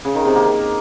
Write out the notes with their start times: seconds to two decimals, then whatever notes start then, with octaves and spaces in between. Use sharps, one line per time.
0.05 C#3
0.15 D#3
0.25 C3
0.35 A#3